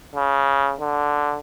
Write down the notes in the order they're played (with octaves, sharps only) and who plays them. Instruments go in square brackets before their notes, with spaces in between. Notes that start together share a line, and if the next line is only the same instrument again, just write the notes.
[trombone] C#3
D3